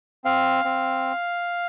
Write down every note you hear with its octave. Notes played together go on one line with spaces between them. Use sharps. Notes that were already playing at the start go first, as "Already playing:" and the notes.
C4 F5
C4